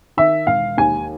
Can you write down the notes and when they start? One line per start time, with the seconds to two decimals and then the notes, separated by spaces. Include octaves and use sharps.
0.17 D#3 E5
0.47 E1 F5
0.77 D#2 G#5